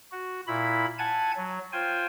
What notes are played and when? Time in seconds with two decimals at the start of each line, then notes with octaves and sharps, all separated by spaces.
0.12 F#4
0.47 A#2 E4 B5
0.98 F#5 G#5 A5 G#6
1.37 F#3
1.72 F4 C5 G5 G#5